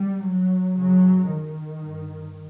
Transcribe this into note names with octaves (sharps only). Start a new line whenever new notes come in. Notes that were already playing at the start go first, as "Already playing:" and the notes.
Already playing: G3
F#3
F#2 C#3 F#3
D#3
G2